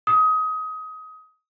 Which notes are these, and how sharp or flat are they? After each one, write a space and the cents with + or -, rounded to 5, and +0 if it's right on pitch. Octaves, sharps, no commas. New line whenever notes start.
D#6 +20